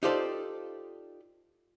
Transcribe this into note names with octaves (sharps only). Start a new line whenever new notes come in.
D#4 F4 G4 A4 C5 D5